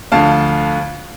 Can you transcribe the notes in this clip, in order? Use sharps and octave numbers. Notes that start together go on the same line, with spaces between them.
D2 D3 F3 F5 A5